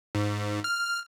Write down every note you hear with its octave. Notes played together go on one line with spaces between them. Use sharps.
G#2
F6